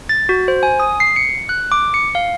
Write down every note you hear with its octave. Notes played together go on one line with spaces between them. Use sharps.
A6
F#4
C5
G#5
D#6
C7
C#7
F#6
D6
C#7
F5